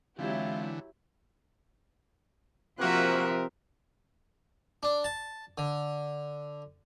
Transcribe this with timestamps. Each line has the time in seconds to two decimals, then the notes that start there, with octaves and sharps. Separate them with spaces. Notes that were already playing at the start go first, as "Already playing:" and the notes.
0.19 D3 E3 F#3 G#3 C4 E4 F4 G4
2.79 C3 F3 A#3 C4 F#4 A#4 E5 F#6
4.83 D4
5.04 A5
5.58 D3